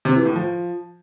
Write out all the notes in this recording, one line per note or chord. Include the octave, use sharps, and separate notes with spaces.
C3
E3
A2
F3